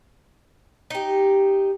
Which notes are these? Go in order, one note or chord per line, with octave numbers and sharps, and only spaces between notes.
D#4 G4